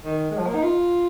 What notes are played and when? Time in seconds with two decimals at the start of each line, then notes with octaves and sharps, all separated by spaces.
0.04 D#3
0.30 G#3
0.37 F3
0.46 A#3
0.54 D#4
0.62 F4